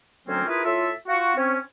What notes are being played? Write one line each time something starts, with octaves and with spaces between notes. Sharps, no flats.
D2 F#3 A#3 C4 C#4
E4 F4 G#4 A#4 B4
A2 F4 A4 E5
F4 F#4
C4 C#4